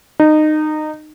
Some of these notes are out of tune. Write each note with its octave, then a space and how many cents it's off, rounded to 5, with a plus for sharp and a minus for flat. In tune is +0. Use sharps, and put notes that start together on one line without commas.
D#4 -20